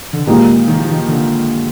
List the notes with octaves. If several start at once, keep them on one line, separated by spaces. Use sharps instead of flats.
D3
A#2 D#3 G#3 D#4 G4
D#3
F3
D#3
D3